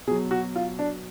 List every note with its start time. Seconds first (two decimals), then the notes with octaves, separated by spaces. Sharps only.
0.07 B2 G#4
0.11 F#3
0.31 F#4
0.56 F4
0.79 D4